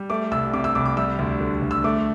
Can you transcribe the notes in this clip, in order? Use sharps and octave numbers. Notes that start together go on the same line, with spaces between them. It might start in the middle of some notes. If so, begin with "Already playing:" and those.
Already playing: G3
A3 D6
C2 E6
C3 D6
E6
C2 D6
D6
G3 E6
D2
D3
D2
E6
A3 D6